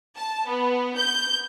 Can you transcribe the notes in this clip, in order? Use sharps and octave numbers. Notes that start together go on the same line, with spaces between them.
A5
B3
G6